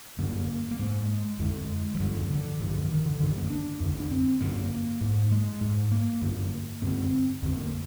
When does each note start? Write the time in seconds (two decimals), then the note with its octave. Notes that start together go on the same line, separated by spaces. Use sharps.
0.19 G2 D3 A#3
0.71 A#3
0.79 G#2 G#3
1.39 F2 D3 G#3
1.95 F3
2.00 G2 D3 G3
2.15 F3
2.30 D3
2.60 G2 D3 D#3
2.75 F3
2.90 D#3
3.06 D3
3.20 G2 D3 D#3
3.36 A#3
3.50 D4
3.80 F2
3.85 D3
4.00 D4
4.11 C4
4.41 G2 D3 A#3
5.01 G#2
5.31 G#3
5.61 G#2
5.92 A#3
6.22 G2 D3
6.82 G2 D3 C4
7.42 F2 D3 C4
7.57 A#3